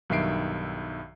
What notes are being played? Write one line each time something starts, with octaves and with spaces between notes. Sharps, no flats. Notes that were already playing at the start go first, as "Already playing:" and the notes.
B1 G2 D#3 E5 C7 D7